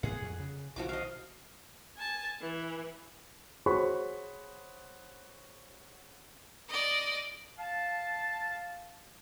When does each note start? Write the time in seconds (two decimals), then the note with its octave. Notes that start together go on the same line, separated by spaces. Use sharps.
0.03 A2 B3 G#4 F#5
0.22 F2
0.39 C#3
0.76 B1 D#3 F3 F#4 D6
0.89 D#5 F5
1.97 G#5 A5
2.42 E3
3.66 F#4 G#4 C5 C#5 B5 C#6
6.69 D5 D#5
7.59 F5 A5